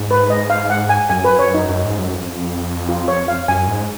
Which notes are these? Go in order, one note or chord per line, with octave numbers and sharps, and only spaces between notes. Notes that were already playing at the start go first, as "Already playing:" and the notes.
Already playing: G#2
B4
D#5
F5
F#5
G#5
F#2 G#5
B4
F#2 C#5
D#4
F#2
G#2
F#2
F2
F4
C#5
F5
F#2 G#5
G#2